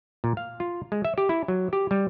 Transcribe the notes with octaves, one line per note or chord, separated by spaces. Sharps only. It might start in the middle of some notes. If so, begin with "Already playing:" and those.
A#2
F5
F4
G#3
E5
G4
E4
F#3
G4
G3